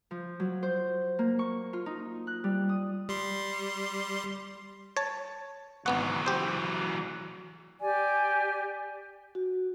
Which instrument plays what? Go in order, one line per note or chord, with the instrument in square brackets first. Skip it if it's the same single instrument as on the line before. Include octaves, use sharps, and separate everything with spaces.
[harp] F3
F#3
C5
A#3
C#6
F4
D#4
F#6
G3
D#6
[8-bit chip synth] G3 C6
[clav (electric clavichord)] C#5 A5
[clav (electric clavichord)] G#1 B3 F#5 [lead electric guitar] E3 F#3
[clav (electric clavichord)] G4 C5
[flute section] G4 D5 G#5
[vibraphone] F#4